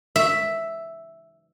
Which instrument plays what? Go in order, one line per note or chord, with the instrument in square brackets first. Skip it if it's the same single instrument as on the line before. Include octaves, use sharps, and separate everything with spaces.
[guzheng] E5